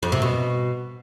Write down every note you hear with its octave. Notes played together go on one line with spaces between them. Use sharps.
F2
C3
B2